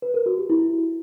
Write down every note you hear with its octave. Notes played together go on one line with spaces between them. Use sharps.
B4
A#4
F#4
G4
E4